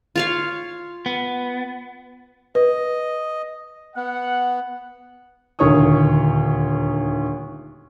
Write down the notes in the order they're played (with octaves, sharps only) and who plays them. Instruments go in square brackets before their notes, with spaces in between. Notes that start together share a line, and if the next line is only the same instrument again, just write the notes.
[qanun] F4 C#5 F5
[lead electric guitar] B3
[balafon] B4 [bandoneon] D#5
[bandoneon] B3 [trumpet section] F#5
[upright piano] D#1 D2 D#3 C#5 C#6 D#6